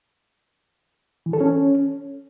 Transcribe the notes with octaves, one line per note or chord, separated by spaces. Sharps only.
E3
A4
C#4